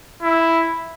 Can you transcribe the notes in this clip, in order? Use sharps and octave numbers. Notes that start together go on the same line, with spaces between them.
E4